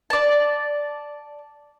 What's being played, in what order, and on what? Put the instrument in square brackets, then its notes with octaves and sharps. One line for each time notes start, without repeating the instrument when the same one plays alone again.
[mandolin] D5 A5